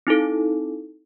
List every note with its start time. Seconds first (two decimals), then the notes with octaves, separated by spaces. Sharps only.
0.07 C4 D#4 E4 A4